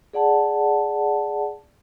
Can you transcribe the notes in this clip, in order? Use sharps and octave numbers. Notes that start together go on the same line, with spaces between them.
G#4 D5 F#5 A5